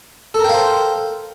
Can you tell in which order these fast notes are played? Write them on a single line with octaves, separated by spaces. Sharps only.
A4 A#4 G5 F5 C5